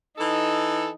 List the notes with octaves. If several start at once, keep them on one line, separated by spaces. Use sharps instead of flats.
E3 D#4 A4